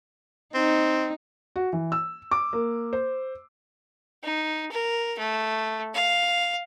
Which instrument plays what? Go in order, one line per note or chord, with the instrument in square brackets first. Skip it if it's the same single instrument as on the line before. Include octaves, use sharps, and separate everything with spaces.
[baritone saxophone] C4 [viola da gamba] D#4
[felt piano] F#4
E3
E6
D6
A#3
C5
[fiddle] D#4
A#4
A3
F5